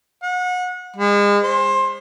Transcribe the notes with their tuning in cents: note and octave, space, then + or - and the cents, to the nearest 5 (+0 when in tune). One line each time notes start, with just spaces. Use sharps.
F#5 -30
G#3 -35
C5 +20